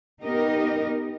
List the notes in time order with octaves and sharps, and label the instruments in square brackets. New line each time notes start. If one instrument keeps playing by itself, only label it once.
[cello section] B3 D#4 G4 A#4 D#5